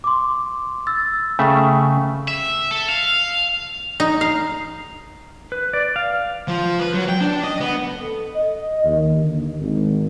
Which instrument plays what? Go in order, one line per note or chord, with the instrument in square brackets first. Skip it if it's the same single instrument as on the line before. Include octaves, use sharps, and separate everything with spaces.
[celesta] C6 D6
E6 A6
[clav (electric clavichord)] C#3 A3 E5 [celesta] G5
[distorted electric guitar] E5
A4
F5
[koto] D#4
F5
[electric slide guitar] B4
D5
F5
[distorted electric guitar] F3
B4
F#3
G5
D4
D#5
B3
[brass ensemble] A4
D#5
D#2
D3
G#1